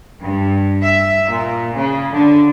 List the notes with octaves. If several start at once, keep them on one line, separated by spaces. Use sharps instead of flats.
G2
E5
A#2
C#3
D3